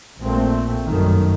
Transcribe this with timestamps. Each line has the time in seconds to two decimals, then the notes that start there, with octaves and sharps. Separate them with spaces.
0.20 A#1 A#2 A3 C4
0.85 G1 F#2 D#3 F#3 A3